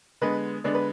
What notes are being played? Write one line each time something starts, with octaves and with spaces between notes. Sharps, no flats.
D3 G#3 B3 B4 D#5
D3 G#3 B3 D5
B4